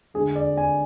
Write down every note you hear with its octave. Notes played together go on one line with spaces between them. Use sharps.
D2 D3 G#3 G#4
D5
G#5